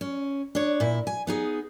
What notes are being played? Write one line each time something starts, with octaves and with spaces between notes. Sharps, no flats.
C#4
D4 C#5
A#2 E4
G#5
B3 D#4 G#4